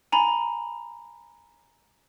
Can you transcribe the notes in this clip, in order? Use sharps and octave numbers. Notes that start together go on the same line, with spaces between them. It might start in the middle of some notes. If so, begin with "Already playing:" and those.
G#5 A#5 B5